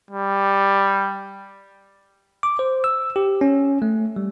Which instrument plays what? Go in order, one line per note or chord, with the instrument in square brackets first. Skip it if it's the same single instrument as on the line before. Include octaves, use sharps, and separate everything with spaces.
[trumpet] G3
[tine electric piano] D6
C5
E6
G4
C#4
A3
G3